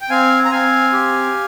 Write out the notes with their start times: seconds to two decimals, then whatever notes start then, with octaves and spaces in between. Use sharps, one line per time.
0.01 G5
0.10 C4 F5 G#5
0.45 A#5
0.51 C4 F5 G#5
0.93 G4